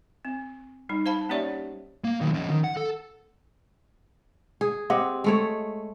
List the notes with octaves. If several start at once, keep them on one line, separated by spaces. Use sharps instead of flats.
C4
G3 D#4
C5 F5 A5 B5
A#3 C#4 G4 C#5 D5 E5
A#3
D#3 F#3
F3 C#4
D#3
F#5
A4
G#4
C4 G4 D#5 F#5
G#3 A3 C#5